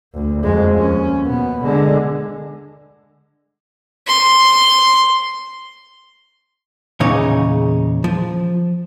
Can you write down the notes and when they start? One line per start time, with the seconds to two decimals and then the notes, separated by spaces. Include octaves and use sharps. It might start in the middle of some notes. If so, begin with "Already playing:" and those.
0.14 D2
0.43 F2 G#3
0.75 D#2 C#4
1.25 B2 B3
1.64 D3 G#3
4.07 C6
7.00 E2 A#2 C#3 D#4 C#5
8.04 F3